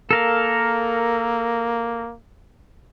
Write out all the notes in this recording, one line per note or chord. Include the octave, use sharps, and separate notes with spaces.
A#3 A4 A#4 F5